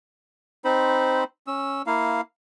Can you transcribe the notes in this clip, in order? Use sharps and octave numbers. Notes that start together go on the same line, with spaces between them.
C4 D#4 C5 B5
C#4 E6
A#3 E4 F5